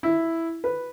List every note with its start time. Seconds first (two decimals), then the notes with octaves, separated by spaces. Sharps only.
0.03 E4
0.64 B4